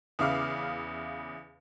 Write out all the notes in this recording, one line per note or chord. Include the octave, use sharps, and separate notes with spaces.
E2 C#3 E5 F5 D6 F6